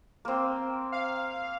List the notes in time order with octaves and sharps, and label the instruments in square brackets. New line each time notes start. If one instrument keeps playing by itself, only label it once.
[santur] A#3 C4
[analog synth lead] F5